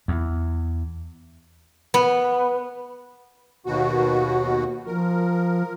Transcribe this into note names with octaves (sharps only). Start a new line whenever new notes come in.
E2
B3
D#2 B2 F#4
F3 A#4